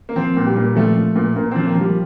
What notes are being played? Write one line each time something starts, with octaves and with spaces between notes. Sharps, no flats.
A#3
F3 C4
A#2
G3
A#2
A#3
F3 A3
F3
A#2
A#2 A#3
F3 C4
A#3
F3
G3